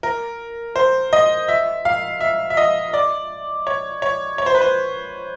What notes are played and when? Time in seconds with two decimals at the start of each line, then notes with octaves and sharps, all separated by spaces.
0.03 A#4
0.76 C5
1.13 D#5
1.48 E5
1.85 F5
2.21 E5
2.50 E5
2.57 D#5
2.94 D5
3.67 C#5
4.02 C#5
4.38 C#5
4.46 C5
4.55 B4
4.61 C5